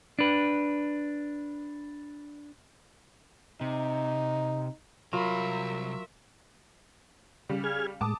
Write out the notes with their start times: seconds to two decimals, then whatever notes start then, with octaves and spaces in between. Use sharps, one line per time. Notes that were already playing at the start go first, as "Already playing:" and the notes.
0.19 D4 B4
3.61 C3 D#4
5.13 C2 F#3 F4 A#4 E5 B5
7.49 C#3 G3
7.64 G#4 F6 G#6
8.01 A2 G#3 A5 D6 D#6